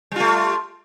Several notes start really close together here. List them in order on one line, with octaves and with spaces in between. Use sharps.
G3 F4 A3